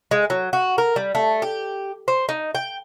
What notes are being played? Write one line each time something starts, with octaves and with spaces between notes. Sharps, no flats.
G#3
F#3
F#4
A#4
G3
A3
G4
C5
D#4
G5